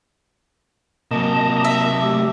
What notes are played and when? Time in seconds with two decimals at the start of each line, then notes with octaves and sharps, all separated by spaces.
1.11 C3 F#3 A#3 D#5 A5 A#5
1.64 E5
2.02 A3 G4